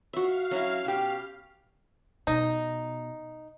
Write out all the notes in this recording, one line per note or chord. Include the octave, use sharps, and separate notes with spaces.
F#4 E5 F5
F#3 C#4 E4
B2 G4 F6
B2 D#4